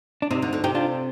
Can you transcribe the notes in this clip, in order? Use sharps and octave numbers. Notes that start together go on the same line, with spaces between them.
D4
C3 C4 D#4
D2 D3
D2 D3
C3 D#4 G4
D4 F4